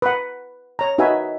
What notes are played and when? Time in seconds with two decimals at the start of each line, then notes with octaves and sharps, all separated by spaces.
0.02 B4 F#5
0.79 C#5 A#5
0.98 D#4 F#4 B4 E5 G#5